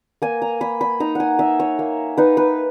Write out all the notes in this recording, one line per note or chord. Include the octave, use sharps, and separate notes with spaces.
A#3 G#5
A#5
A#3 B5
B5
D#4 A#5
F#5 G#5
D#4 E5
C#5
A#3
D#4 B4
B4